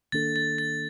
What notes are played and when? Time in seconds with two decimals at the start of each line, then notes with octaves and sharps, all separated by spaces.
0.12 D#3 A#3 D4 A4 A6
0.36 A6
0.58 A6